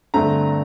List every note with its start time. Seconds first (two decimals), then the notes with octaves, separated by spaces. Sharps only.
0.14 G2 D3 A3 C4 A#5